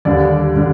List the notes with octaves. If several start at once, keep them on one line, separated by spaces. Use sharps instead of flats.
D#2 D3 G3 D5
D3 G3